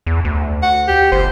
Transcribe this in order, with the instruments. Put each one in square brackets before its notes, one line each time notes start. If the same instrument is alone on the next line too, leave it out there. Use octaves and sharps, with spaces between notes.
[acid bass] E2
D2
[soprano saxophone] F#5
G4
[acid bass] G1 [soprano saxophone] C5